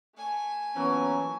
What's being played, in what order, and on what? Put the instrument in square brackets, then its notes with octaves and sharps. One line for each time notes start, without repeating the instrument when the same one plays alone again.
[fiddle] A3 G#5
[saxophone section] E3 C#4 [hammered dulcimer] F#3 A#3 [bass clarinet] B3